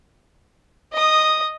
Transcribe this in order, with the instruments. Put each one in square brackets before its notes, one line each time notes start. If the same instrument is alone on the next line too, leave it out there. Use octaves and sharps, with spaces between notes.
[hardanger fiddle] D#5 D#6